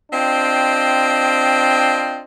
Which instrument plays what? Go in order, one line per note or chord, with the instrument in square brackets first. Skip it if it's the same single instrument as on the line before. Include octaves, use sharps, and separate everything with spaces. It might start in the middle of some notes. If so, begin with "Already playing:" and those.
[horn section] C4 D4 F4 D#5 G5